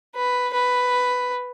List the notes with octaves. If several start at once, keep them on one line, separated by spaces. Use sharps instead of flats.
B4
B4